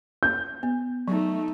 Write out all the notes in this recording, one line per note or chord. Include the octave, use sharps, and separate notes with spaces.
G6
B3
F#3 A3 D#4